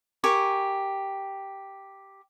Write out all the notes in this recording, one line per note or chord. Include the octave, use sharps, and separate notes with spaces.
G4 A#4 G#5 C#6